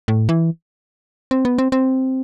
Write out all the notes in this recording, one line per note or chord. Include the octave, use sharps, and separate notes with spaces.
A2
E3
C4
B3
C4
C4